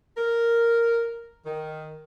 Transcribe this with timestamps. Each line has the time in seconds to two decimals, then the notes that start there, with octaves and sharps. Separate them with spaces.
0.17 A#4
1.44 D#3